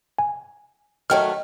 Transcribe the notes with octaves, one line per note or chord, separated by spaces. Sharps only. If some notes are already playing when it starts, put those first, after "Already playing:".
G#5
D#3 F#3 A3 C#5 G5 F6